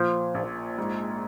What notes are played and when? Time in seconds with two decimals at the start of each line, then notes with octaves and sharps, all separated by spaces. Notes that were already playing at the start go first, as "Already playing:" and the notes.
Already playing: A#2 F3
0.35 A#1
0.78 G#2